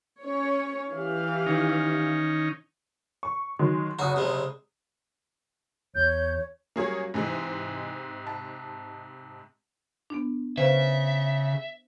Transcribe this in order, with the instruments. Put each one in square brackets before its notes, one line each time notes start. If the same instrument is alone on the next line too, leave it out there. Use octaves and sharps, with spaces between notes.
[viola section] C#4 C#5
E3 G4 F5
[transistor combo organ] D#3 C#4 D#4
[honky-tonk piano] C#6
D#3 F#3 G#3
[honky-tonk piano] F#1 D#6 [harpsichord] F#4
[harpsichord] C3 G#3
[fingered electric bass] E2 [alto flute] C#5 [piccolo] G6
[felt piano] F#3 G3 C#4 [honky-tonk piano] A#3 G#4 C#5
[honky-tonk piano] G#2 C3 G#3 [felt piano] E3
[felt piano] A5
[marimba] B3 D4
[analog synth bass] C#3 [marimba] B4 C5 F5 [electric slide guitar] E5